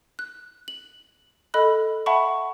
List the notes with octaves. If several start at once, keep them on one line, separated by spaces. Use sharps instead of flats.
F#6
F#7
A4 D#5 B5 F#6
E5 F#5 A5 B5 C#6